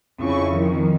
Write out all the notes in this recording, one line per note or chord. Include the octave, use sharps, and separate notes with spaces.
F2 C#3 E4 C#6
F2 D#3 F3